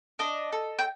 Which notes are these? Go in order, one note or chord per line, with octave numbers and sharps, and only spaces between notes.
D4 D#5
A4
G5